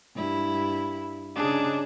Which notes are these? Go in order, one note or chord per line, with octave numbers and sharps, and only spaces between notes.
G2 E4
C#3 D4 D#4 G#4